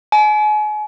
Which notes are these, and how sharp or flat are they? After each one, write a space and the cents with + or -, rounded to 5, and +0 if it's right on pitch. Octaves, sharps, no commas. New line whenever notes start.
G#5 +35